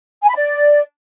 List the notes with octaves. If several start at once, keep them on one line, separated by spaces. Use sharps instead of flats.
G#5
B5
D5